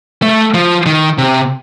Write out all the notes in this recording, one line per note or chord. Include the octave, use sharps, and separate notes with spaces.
A3
F3
D#3
C3